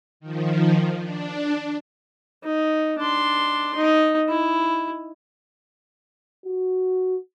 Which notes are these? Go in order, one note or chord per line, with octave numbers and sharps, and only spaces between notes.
D#3 F3
D4
D#4
D4 C6
D#4
E4
F#4